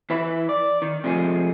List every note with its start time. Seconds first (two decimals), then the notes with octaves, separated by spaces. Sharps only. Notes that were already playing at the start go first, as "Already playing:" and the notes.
0.10 E3 B4 E5 B5
0.49 D5
0.82 D#3
1.04 C3 F3 G#3 A3 G#4